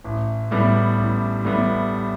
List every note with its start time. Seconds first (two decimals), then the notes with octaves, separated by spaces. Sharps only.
0.04 A1
0.51 A2 G3 B3
0.98 A1
1.45 A2 G3 B3